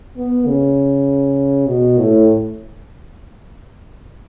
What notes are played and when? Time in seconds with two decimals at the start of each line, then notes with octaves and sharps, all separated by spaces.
0.17 B3
0.47 C#3
1.67 B2
1.97 A2